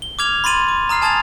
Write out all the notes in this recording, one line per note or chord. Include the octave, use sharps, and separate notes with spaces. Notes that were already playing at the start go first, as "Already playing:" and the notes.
G7
D6 F6 G#6 F7
B5 C6 A6 D#7 F#7
D6
A#5 D#6 F6 C7
G#5 A5 D#6 G#6 A6 F7